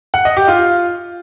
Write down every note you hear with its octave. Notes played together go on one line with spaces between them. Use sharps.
F#5
D#5
G4
F4